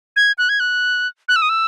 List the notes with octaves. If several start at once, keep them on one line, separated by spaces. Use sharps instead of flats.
G#6
F#6
G#6
F#6
F#6
E6
D#6
E6